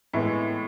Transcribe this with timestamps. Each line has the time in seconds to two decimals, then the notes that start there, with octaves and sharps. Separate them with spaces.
0.13 A2 E3 G#3 B3